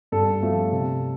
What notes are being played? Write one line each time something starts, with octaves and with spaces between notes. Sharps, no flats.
G2 A4
F3 A3
C3